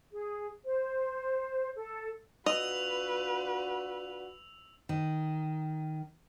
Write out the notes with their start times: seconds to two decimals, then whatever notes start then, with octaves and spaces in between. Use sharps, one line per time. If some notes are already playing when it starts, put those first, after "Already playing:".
0.11 G#4
0.65 C5
1.76 A4
2.46 D4 F4 F#4 B4 D#5 E6 F7
4.89 D#3